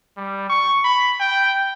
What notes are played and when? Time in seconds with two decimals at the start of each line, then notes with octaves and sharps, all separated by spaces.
0.17 G3
0.50 C#6
0.84 B5
1.20 G5